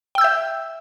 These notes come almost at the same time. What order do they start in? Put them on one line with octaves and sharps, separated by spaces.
G5 E6 G6 E5